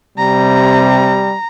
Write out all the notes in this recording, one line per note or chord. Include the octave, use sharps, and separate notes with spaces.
C3 G3 A#5